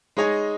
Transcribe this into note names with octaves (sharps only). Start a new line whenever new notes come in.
G#3 D#4 G#4 C#5